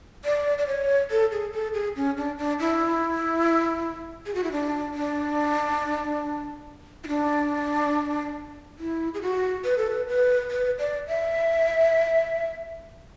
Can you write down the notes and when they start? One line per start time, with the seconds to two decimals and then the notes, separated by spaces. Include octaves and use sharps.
0.25 D5
0.58 D5
0.67 C#5
1.11 A4
1.32 G#4
1.53 A4
1.74 G#4
1.96 C#4
2.17 D4
2.38 D4
2.59 E4
4.26 G#4
4.35 F#4
4.44 E4
4.52 D4
4.94 D4
7.04 E4
7.08 D4
8.79 E4
9.14 G#4
9.22 F#4
9.64 B4
9.78 A4
9.90 B4
10.08 B4
10.51 B4
10.79 D5
11.07 E5